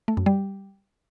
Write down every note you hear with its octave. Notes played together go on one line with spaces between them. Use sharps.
A3
F#2
G3